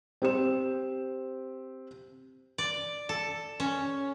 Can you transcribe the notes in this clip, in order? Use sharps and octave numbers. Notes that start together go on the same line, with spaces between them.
C4 G4 C5 E7
D5
A4
C#4